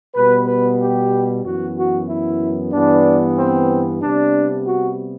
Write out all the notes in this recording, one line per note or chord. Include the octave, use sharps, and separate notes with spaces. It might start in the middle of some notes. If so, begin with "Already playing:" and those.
B2 G3 B3 B4
B4
G4
F#2 E3 B3 F#4
F#4
E4
G2 E3 B3 D4
C4
C3 G3 B3 D4
F#4